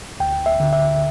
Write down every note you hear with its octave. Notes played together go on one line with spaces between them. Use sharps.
D2 G5
E5
D3
E5